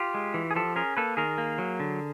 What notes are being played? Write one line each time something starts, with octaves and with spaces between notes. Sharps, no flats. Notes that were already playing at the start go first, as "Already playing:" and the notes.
Already playing: F4 G4
G#3
E3
G#4
F3 G4 A4
C#4 G#4 A#4
A#3 A4 B4
D#3 G#4 A#4
A#3
F#3
D3